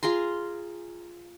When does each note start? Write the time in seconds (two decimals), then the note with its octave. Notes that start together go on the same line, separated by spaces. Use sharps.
0.03 F4 G#4 A#5 C6